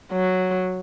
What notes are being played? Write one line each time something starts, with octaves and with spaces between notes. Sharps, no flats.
F#3